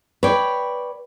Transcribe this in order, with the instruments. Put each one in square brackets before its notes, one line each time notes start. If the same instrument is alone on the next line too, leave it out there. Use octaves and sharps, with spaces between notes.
[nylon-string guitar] B4 D5 [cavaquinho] C#5 G5